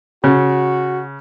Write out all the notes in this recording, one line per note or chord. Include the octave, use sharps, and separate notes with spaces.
C#3 F#4